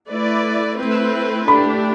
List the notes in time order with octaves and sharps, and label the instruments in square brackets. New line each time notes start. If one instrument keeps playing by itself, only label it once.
[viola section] A3 E4 B4 D5
A3 C4 E4 B4
[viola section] A3 D4 G4 [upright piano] B5